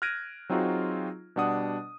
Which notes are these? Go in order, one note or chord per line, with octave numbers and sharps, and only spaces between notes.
F6 F#6 G#6 A#6 D7 D#7
F#3 C4 D#4 F4 F#4 G#4
B2 G3 D4 F#5 D#6